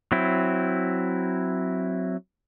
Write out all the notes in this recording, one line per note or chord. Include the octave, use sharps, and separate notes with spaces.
F#3 C4 E4